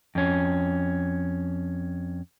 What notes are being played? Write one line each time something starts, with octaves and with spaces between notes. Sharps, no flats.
F2 C#4